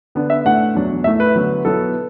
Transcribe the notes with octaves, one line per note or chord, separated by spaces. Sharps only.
D3 B3 D4
E5
A2 A3 D4 F#5
E2 B2 F#3 D4
A2 A3 E4 E5
B4
D3 F#3 B3
B2 F#3 B3 E4 A4